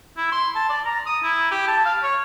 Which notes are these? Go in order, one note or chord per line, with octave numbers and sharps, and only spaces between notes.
E4
C6
A5
D5
A#5
D#6
E4
G4
A5
F5
C#5